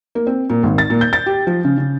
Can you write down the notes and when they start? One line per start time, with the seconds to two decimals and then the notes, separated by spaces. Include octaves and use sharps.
0.15 A#3
0.27 C4
0.50 A#2
0.63 G#1
0.78 A6
0.90 A#2
1.01 G6
1.13 A6
1.26 G4
1.47 F3
1.65 C#3
1.78 C#3